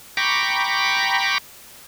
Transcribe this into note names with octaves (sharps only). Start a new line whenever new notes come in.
G5 A#5 B5 C#6 D6